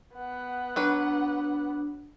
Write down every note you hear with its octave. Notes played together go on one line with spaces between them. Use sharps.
B3 F#5
F#3 D4 B4